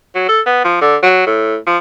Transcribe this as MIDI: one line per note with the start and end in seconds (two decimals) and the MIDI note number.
0.15 0.24 54
0.29 0.41 69
0.46 0.60 59
0.64 0.78 53
0.81 0.96 50
1.03 1.25 54
1.26 1.57 45
1.67 1.78 53